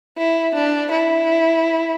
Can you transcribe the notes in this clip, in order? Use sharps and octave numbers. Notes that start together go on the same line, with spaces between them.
E4
D4
E4